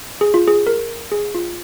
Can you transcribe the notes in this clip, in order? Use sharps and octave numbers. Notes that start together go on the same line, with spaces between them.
G#4
F4
G#4
A#4
G#4
F4